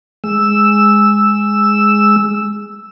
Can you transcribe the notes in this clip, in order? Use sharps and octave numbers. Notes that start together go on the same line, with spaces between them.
G#3 E6